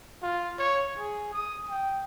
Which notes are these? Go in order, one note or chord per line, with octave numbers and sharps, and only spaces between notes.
F4
C#5
G#4
D#6
G5